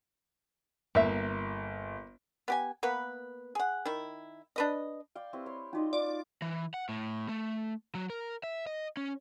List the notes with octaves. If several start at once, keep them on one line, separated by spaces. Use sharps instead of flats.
G1 A#3 E5
B3 G4 G#5
A#3 B3 B4
G#4 F#5
D#3 E4
D4 B4 D#5
D5 F5 G5
C4 E4 G4 B4
C#5 C6
C#4 D#4 F4 F#4 D5 D#5
F4 D5
E3
F#5
A2
A3
F#3
A#4
E5
D#5
C#4